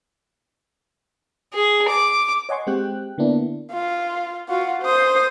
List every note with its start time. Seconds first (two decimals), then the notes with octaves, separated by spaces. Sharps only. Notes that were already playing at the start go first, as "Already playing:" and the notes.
1.54 G#4
1.89 D6
2.49 C#5 D#5 F#5 G#5 C6 C#6
2.67 G#3 C4 G4 G5 F#6
3.18 D3 A#3 B3 D4 E4
3.72 F4
4.49 F4 F#4
4.82 C5 D#6